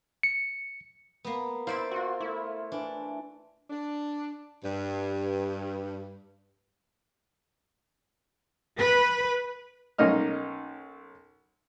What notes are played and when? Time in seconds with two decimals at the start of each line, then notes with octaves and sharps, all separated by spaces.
0.23 C#7
1.24 A#3 B3
1.67 E4 C5 D5 E5 F5
1.91 F4 F#4 C#5 C6
2.20 A3 E4
2.72 E3 D4 A5
3.70 D4
4.64 G2
8.76 B4
9.98 B1 A#3 C#4 D#4 D#5 F6